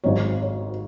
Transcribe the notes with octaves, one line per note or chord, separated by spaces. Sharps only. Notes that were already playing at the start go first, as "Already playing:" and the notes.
G#1 G#2 F#3 C#5
C#5